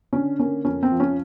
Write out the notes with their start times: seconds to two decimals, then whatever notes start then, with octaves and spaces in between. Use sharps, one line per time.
0.13 D3 C#4
0.39 A#3 C#4
0.65 F2 C#4
0.83 C4
0.92 F3
1.00 C#4